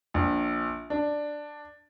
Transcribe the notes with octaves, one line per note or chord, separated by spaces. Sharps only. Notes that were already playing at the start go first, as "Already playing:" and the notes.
A#1
D4